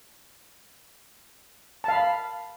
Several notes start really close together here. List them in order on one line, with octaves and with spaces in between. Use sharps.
A5 F5 B5